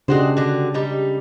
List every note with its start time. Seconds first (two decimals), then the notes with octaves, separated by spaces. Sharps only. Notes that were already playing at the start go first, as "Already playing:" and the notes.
0.08 C#3 G#3 D4 F#4 G4 C5
0.37 D3 F#4
0.74 G3 D#4